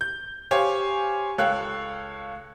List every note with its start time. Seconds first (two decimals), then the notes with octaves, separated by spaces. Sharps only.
0.01 G6
0.51 G4 C5 C#5 F5 G#5
1.38 C#2 A4 C#5 F5 G5 F#6